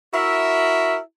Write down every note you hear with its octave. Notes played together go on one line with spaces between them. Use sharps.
E4 F#4 A#4 E5